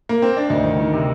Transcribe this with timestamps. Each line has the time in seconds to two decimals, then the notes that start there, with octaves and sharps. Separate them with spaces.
0.09 A#3
0.22 C4
0.37 D4
0.50 D2 D#4
0.64 D#3
0.80 D#3
0.94 C3